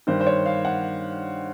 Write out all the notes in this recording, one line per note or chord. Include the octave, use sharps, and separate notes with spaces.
G2 D#3 C5
C5
C#5
F5
F#5